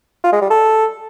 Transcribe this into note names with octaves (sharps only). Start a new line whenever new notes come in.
F4
G#3
G3
A4